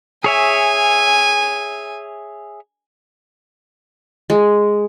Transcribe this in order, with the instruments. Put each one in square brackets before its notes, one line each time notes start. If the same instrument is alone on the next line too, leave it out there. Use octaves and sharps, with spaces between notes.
[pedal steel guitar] G#4 C#5 E5 [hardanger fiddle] G#5
[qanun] G#3